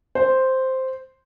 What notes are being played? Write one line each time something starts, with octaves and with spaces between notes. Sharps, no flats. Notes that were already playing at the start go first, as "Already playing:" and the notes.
C5